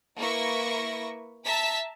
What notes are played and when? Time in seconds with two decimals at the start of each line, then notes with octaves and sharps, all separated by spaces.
0.17 A#3 E4 B4 E5 C#6 A#6
1.45 E5 A5 A#5 B6